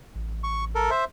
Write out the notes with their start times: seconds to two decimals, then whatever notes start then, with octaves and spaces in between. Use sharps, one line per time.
0.15 A1
0.44 C#6
0.75 A4 A#4
0.91 C5 E5